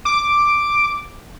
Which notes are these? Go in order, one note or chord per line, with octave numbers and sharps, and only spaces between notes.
D6